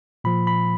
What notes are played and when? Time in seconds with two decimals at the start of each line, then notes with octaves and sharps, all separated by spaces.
0.24 A#2 F3 B5
0.47 B5